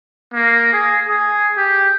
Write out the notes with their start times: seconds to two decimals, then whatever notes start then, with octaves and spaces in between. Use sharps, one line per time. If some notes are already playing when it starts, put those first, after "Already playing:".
0.34 A#3
0.73 G#4
1.08 G#4
1.57 G4